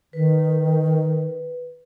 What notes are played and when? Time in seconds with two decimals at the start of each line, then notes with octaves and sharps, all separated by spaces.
0.13 D#3 B4